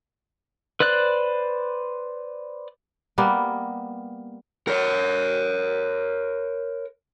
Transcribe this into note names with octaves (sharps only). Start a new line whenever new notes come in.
B4 C5 D5 F#6
G3 A#3 B3
A#4 C#5